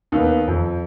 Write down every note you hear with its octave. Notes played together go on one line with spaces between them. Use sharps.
D#2 B3
F2